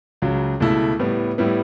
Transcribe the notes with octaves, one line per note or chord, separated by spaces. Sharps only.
C#2 C#3 F#3
C#2 B2 A3 E4
A2 G3 B3
A2 G3 B3 E4